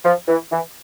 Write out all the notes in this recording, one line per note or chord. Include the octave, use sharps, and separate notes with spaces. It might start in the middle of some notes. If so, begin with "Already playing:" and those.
F3
E3
E3